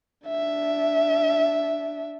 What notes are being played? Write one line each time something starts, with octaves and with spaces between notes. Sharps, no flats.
D4 E5